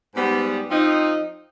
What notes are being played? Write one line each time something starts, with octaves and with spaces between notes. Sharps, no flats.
G#2 G3 B3
F3 C4 D#4